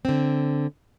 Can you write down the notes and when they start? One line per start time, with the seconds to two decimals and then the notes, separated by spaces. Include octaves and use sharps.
0.05 D3 C4